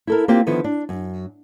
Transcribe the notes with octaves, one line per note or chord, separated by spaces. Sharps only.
E4 A4 A#4
A#3 C4 F4 G4
D3 D#3 F3 B3 E4
D4
F#2